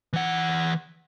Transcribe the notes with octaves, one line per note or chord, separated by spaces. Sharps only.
E3 F#5